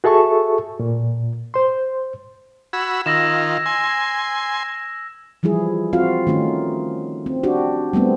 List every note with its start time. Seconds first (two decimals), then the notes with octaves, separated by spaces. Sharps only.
0.04 F#4 G#4 A4 E5 A5 C#6
0.79 A#2
1.54 C5 C6
2.73 F#4 B5 E6 G#6
3.06 D#3 F4 E6 A#6 E7
3.66 G#5 C6
5.43 E3 F3 G3 E4 G#4
5.93 C4 F4 F#4 F5
6.27 D#3 A3 C#4 D#4
7.26 C4
7.43 D4 F#4 G4
7.93 G3 A3 B3 C4